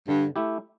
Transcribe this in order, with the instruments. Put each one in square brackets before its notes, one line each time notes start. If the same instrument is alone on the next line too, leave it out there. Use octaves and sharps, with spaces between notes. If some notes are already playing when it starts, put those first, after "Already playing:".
[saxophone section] G2 [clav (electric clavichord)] D3
[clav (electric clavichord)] A3 E4 G4